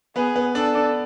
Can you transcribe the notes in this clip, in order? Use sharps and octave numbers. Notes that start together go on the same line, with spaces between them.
B3 G#4 B4
B3 B4
D4 A4 D5
D4 D5